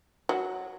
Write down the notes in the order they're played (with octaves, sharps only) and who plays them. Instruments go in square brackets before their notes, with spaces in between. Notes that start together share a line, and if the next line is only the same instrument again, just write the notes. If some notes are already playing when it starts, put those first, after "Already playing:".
[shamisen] F#3